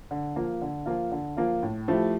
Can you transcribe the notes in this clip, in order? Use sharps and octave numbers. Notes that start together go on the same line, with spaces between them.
D3
F3 A#3 F4
D3
F3 A#3 F4
D3
F3 A#3 F4
A2
F3 A3 E4 G4